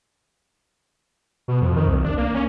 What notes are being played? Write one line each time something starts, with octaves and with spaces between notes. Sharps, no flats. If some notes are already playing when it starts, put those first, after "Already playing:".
B2
F2
D#3
C2
D4
A#3
C#4